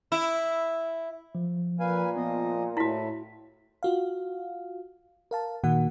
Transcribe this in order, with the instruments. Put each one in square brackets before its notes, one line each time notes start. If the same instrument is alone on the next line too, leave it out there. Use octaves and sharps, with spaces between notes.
[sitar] E4
[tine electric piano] F3
[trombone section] A#2 [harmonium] B4 F5 G#5
[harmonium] F3 D#5 [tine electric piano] B3
[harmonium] A2 [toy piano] E4 F#4 [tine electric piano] A5 B6
[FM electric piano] F4 F#4 F5
A#4 F5 A5
A#2 D#3 A#3 F#4 F#5